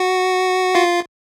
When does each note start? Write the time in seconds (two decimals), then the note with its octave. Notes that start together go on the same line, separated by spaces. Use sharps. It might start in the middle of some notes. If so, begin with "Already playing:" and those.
Already playing: F#4 F#5
0.75 F4 F5